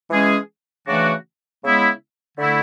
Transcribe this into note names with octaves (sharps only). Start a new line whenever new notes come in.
E3 G#3 C#4 G#4
C#3 E3 A3 D4 F#4
C#3 G#3 B3 E4
D3 A3 E4